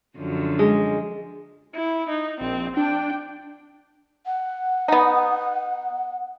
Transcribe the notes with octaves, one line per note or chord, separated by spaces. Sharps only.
F#2 D3 F3
G#3
E4
D#4
A#1 C4
D4 G5
F#5
B3 D#4